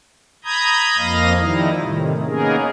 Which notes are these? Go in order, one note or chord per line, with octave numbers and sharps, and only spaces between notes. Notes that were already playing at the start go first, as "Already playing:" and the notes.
A#5 B5 D#6 G6 G#6
F2 F3 A#3 D#5 F5 A#6
D#3 F3 G3 D#4 E4
A2 C3 D#3
A#3 B3 C#4 D#4 G#4 A#4